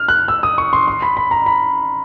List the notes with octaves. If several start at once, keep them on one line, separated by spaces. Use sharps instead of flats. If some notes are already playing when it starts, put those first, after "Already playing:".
Already playing: F6
F#6
E6
D#6
C#6
C6
C6
B5
B5
A#5
B5